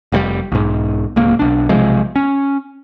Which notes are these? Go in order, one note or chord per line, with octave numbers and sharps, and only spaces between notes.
F1 B2 G3
B1 G#2
D1 C#2 A#3
B1 D4
B1 C3 F3 G#3
C#4